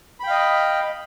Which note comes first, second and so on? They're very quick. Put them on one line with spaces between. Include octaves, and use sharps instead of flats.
B5 G5 F5 D#5